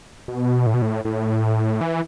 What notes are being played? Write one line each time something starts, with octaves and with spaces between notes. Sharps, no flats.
B2
A2
B2
A2
A2
E3